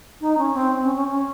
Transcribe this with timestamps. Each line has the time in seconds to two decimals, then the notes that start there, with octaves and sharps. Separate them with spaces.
0.21 D#4
0.38 C#4
0.54 C4
0.84 C#4
0.96 C#4
1.08 C#4